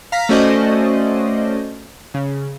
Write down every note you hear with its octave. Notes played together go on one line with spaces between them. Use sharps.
F5 A#5 A#6 B6
A3 C#4 F#4 C5 D5 D#5
C#3